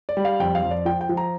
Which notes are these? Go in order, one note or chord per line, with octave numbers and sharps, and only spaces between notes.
D5
G3
F5
F2 G5
F5
F2
D5
F3 G5
G5
F3
A#5